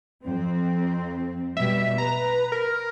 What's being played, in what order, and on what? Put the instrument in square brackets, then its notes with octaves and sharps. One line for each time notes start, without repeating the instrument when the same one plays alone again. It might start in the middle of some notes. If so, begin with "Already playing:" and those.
[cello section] F2 C4
[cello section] B2 G3 [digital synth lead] E5
[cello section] B4 [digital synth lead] A#5
[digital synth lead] A#4